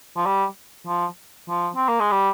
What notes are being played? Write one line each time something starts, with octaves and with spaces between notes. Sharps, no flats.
F3
G3
F3
F3
C4
A#3
G#3
G3